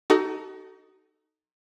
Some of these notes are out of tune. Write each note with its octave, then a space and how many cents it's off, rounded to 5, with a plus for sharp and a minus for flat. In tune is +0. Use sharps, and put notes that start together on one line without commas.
D#4 +0 F#4 +40 A4 +0